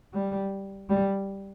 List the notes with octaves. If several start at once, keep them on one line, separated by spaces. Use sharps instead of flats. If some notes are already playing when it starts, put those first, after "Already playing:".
G3
G3